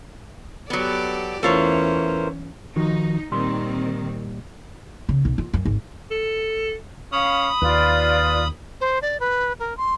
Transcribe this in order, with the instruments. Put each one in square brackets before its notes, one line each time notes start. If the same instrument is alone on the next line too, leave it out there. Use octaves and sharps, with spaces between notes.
[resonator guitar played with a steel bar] F#3 B3 [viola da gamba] G4 A4 D5
[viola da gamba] E2 C#4 [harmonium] E3 A#4 C5 [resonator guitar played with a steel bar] A3 F4 C#5
[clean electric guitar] D#3 F3 F#4 [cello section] D#4
[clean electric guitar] A#2 G3 C6 [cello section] D#3 C4
[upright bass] C#3
B1
F4
F#2
G#1
[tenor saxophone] A4
[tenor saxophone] C#4 [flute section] F5 [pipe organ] B5 D#6
[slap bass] D#2 [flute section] F4 D5 [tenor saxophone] B4
[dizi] C5
D5
B4
A#4
C6